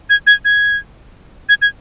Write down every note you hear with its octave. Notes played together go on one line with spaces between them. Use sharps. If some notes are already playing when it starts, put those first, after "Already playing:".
G#6
G#6
G#6
G#6
G#6